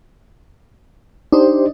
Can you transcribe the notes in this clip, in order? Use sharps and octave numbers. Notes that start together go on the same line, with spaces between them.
D4 D#4 G4 C5